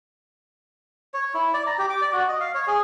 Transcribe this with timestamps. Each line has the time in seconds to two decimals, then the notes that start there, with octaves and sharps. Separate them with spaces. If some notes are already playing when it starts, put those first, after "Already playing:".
1.14 C#5
1.34 E4
1.54 D5
1.67 A#5
1.78 G4
1.90 D6
2.02 D5
2.13 F#4
2.28 D#5
2.40 F5
2.54 C#5
2.67 G#4